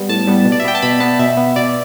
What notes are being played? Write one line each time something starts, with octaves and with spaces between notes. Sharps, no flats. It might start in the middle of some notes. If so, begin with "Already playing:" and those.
Already playing: G3 B3
A2 A5
G3 B3
B2
D5
E5
B3 G5
A5
B2 B5
B3 A5
B2 E5
B3
B2 D5